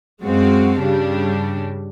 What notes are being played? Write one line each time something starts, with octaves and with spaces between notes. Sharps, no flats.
F#2 G#3 C4 F#4 F5
G2 C#3 G3 D4